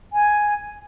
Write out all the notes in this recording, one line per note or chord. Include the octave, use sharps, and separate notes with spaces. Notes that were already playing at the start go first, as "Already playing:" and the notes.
G#5